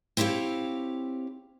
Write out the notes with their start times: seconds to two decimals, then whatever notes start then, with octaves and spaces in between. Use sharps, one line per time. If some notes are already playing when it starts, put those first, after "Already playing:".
0.17 C4 E4 G4 C#5 F5